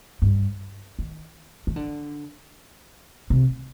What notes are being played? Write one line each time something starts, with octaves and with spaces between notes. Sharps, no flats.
G2
D#3
D#3
D3
C3